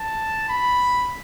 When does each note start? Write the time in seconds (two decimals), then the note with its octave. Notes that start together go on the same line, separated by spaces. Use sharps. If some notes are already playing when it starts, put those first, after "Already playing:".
Already playing: A5
0.49 B5